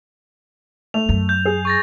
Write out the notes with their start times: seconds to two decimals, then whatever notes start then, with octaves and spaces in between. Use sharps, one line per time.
0.94 A3 F7
1.09 F#2
1.29 G6
1.45 G#4
1.65 C#6 A6 A#6